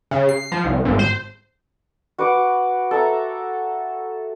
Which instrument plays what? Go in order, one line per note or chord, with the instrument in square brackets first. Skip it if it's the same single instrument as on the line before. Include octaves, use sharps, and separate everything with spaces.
[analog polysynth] C#3
C7
F3
C2
G#1
C5
[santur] F#4 B4 F#5 D6
A4 E5 A#5